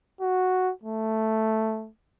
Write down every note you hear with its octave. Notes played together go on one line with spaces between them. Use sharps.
F#4
A3